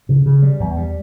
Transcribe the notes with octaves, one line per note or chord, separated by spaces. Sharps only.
C#3
C#3
G3
E2
G3